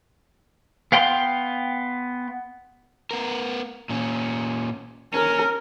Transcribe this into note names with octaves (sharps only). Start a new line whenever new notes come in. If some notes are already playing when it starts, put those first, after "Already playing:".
B3 F5 G5 C6
B3 A#4
A#2 C#4
C#4 A#4